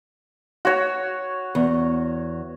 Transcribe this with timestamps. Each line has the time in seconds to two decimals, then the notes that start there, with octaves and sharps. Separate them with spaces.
0.65 F#4 C#5
1.55 E2